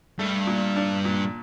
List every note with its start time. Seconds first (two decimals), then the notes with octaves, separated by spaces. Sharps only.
0.19 G2 A3
0.47 A#2
0.76 D4
1.05 A#2